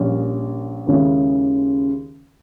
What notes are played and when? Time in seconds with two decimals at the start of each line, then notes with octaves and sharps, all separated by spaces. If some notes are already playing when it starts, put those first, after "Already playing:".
Already playing: A#1 A#2 G3 C#4
0.87 D#2 C#3 G#3 C#4 E4